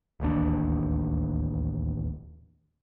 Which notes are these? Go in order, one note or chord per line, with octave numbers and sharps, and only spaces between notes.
D1 A1 D#2 D4